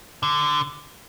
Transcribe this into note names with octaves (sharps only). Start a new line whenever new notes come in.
D3